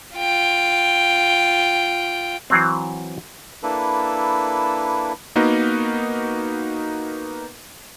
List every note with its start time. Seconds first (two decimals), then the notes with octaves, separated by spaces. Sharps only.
0.16 F4 G5
2.50 E3 F#3 C4
3.63 A#3 D4 E4 A4 B4
5.36 A#3 B3 D#4 F#4 A#4 B4